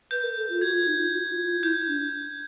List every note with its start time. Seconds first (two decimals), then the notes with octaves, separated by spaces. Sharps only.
0.11 B4 G6
0.23 A#4
0.37 A4
0.50 F4
0.62 F#4 G#6
0.74 F4
0.87 D#4
0.99 F4
1.13 F#4
1.30 F4
1.45 F4
1.62 E4 G6
1.88 D4